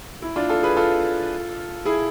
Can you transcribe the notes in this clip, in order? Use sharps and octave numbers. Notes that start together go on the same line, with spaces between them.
E4
D4 F4
F4 A4
G#4 B4
F4 A4
E4 G#4